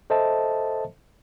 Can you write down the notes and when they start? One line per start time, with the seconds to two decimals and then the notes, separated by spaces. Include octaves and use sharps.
0.10 A4 C5 D#5 E5 A5